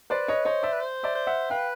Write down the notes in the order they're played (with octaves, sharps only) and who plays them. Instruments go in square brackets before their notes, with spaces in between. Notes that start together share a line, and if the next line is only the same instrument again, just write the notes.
[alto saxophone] B4 [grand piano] C5 D5
[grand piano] C#5 D#5
[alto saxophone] C5 [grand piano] C#5 D#5
[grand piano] D5 E5
[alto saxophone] B4
C5
[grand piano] D5 E5
[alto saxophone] C5
[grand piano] E5 F#5
[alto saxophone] B4 [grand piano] F5 G5